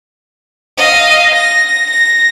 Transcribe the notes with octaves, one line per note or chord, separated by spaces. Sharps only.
D#5 F5
A#6
A#6